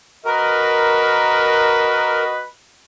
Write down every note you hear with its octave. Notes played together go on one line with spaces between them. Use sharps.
F#4 A#4 B4 D#5